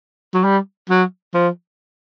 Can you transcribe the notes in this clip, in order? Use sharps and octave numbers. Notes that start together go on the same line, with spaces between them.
F#3
G3
F#3
F3